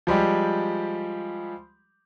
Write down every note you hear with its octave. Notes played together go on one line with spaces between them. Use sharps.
F3 G3 G#3 G4